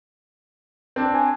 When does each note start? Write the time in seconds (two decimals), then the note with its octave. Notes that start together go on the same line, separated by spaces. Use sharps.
0.96 C4 D4
1.14 G#5